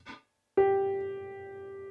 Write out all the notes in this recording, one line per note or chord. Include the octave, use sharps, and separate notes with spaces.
G4